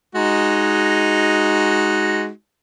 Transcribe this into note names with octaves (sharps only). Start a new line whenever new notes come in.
G#3 D#4 F#4